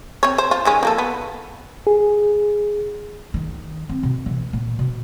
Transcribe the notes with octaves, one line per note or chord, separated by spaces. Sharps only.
C4 C#5
C5
F4
D#3 G#3 C#4
F3 A#3 A4
B3
G#4
D#3
C4
B2
E3
A#2
B2